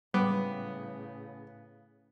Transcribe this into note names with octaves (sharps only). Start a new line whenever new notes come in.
A2 C#3 G3 B3